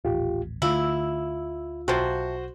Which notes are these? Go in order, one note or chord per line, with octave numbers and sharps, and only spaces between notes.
D#1 A1 F4 G4
D2 D3 A3 E4 F4 E6
B1 C3 F3 F#4 C5